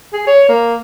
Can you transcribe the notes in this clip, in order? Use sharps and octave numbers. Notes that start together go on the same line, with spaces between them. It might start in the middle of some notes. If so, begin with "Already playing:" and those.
G#4
C#5
A#3